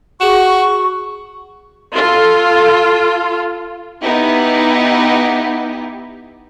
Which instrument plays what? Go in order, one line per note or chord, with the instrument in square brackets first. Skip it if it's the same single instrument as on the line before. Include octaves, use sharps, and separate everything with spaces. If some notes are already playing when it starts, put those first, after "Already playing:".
[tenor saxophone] F#4 [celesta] G#4 E7 [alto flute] C#6
[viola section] F4 A4
[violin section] B3 D#4 E4 G4